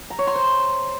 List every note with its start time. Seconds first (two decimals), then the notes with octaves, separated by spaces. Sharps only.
0.10 A#5
0.19 C#5
0.27 C6
0.36 C5